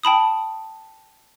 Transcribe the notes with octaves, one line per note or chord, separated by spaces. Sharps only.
G5 A5 B5 D#6